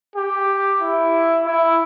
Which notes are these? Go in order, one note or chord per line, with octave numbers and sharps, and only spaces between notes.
G4
E4
E4